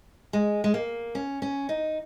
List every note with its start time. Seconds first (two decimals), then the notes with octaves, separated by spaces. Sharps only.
0.33 G#3
0.64 G#3
0.74 A#3
1.15 C#4
1.42 C#4
1.69 D#4